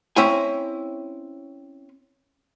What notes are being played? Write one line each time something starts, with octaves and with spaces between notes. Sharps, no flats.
C4 C#4 E4 G#5